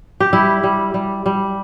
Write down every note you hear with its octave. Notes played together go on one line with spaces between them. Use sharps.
G4
G3 E4
G3
G3
G3